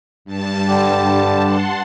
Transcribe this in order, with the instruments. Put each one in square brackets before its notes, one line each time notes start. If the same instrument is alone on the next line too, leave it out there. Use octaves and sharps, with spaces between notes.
[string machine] G2 A5
[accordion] D3 G3 G4
[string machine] F#5 A5 C6